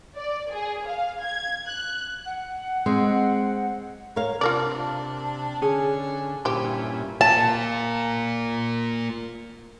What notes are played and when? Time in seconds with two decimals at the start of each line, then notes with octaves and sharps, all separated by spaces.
0.16 D5
0.53 G#4
0.87 F5
1.22 G#6
1.68 F#6
2.26 F#5
2.86 G#3 C4 D#5
4.16 A#4 C#5 F5
4.41 C3 D4 F4 A#4 D5
5.62 D3 C#4 G#4
6.45 G2 A#2 C#4 E4 G4 C5
7.21 A#3 F4 A5